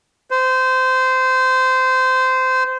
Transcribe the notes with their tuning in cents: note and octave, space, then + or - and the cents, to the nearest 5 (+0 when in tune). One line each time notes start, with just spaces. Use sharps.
C5 -20